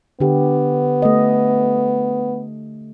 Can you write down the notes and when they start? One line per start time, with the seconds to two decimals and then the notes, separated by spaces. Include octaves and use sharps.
0.20 D3 B3 G4
1.02 A3 D#5